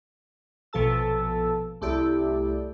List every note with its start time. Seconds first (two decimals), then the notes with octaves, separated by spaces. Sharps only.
0.73 A#1 B2 F3 A4 A5 E6
1.81 C2 A3 E4 G4 D5